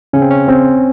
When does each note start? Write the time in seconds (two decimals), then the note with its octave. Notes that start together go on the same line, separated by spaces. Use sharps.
0.13 C#3 C#4
0.22 C4
0.30 C#4
0.48 C4